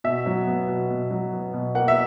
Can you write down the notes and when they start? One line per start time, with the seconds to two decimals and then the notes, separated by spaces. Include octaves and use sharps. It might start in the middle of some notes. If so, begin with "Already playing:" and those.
0.04 B2 E5
0.26 F#3
0.47 B3
0.68 B2
0.90 B2
1.11 F#3
1.33 B3
1.54 B2
1.75 A#3 F#5
1.88 E5